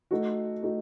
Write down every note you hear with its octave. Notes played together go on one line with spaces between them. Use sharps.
A3 D#4 F#4
A3 D#4 F#4